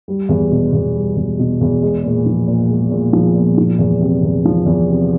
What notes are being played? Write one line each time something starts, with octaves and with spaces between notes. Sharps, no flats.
G3
E2
B2
E2
G3
E2
B2
E2
G#3
A#2
F3
A#2
G#3
A#2
F3
A#2
F3
E2
C3
E2
F3
E2
C3